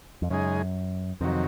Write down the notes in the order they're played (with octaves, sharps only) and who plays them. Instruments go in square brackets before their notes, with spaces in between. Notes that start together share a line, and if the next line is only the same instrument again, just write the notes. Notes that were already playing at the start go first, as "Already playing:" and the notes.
[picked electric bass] F2
[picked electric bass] F#2 [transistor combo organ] C#3 G#3 D#4 G#4
[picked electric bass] F2 [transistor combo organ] C3 D#3 F#3